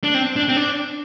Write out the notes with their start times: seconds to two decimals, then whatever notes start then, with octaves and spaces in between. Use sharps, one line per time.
0.04 D4
0.14 C4
0.36 D4
0.49 C4
0.57 D4